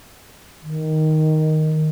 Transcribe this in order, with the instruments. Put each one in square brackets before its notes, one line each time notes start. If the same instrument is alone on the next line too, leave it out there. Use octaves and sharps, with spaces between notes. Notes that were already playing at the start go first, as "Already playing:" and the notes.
[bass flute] D#3